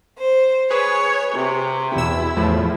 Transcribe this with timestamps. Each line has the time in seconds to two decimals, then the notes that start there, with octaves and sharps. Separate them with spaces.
0.19 C5
0.70 G#4 B4 C#5
1.34 C3
1.95 E2 B2 E4 E6
2.37 E2 A2 F3